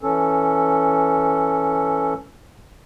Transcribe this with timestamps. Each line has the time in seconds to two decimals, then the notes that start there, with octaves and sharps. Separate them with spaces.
0.03 E3 C#4 A4